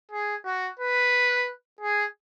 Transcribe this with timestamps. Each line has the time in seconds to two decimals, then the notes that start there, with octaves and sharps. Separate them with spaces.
0.11 G#4
0.45 F#4
0.79 B4
1.81 G#4